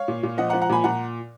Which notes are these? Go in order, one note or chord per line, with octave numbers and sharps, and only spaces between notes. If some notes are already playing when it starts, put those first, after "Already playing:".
Already playing: C#5 F5
A#2
A#2
F3 D#5 F#5
F#5 A#5
F3
F#5 A#5
A#2 G#5 B5
A#2 F#5 A#5